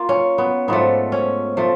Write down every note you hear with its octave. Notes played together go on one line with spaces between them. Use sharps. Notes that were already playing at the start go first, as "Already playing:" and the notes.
Already playing: A#3 F4
C#4
B3
G#2 F3 A3 B3
C#4
F3 A3